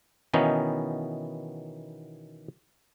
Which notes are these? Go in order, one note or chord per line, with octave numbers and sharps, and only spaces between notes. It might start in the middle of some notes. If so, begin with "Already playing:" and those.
B2 D#3 E3 B3 C#4 D#4